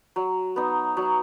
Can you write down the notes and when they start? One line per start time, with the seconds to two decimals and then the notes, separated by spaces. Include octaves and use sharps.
0.16 F#3
0.56 B3 D#4
0.97 F#3